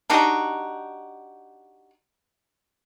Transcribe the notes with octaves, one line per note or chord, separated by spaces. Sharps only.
D4 D#4 F#4 G4